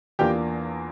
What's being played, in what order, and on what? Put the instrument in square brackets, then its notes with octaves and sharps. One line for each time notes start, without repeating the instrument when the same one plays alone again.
[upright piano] E2 E3 A#3 D4 F4 G4 G5